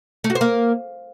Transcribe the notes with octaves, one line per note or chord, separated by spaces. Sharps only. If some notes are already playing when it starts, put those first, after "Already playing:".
A3
F#4
C5
A#3